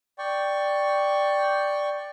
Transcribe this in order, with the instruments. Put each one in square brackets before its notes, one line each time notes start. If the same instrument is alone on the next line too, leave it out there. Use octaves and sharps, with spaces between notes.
[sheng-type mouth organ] D5 G5 C#6